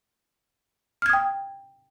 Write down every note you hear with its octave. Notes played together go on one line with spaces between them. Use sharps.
G5 D#6 F6 G#6